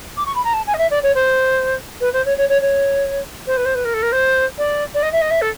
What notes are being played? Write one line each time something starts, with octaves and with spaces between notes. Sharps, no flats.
D6
C#6
B5
A#5
A5
G#5
D#5
E5
D5
C#5
C5
B4
C5
C#5
C#5
C#5
C#5
C5
B4
C5
B4
A#4
A4
A#4
C5
D5
D5
D#5
E5
D#5
E5
A4